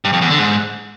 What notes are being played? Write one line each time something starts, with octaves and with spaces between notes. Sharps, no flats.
G2
F2
E2
D3
G#2